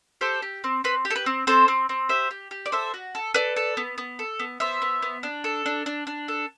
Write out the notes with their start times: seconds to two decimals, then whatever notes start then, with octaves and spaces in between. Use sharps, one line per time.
0.21 G4 A4 C5
0.42 G4
0.64 C4
0.84 C4 B4
1.05 G4
1.10 A4
1.16 B4
1.26 C4
1.47 C4 A4 C5
1.68 C4
1.89 C4
2.09 G4 C5 E5
2.31 G4
2.51 G4
2.66 D5
2.72 A4 C5 E5
2.94 F#4
3.15 A4
3.34 A4 B4 D5
3.56 A4
3.77 B3
3.98 B3
4.19 A4
4.39 B3
4.60 B3 C5 E5
4.82 B3
5.02 B3
5.23 D4
5.44 A4
5.66 D4
5.86 D4
6.07 D4
6.28 A4